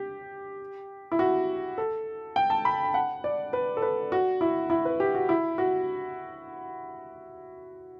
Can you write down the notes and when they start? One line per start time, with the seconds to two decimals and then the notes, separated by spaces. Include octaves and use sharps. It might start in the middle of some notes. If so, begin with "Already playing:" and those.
Already playing: G4
1.12 E4
1.19 F#4
1.78 A4
2.36 G5
2.50 A5
2.65 B5
2.94 F#5
3.24 D5
3.53 B4
3.77 A4
3.82 B4
4.12 F#4
4.41 E4
4.70 E4
4.85 B4
5.00 G4
5.15 F#4
5.29 E4
5.58 F#4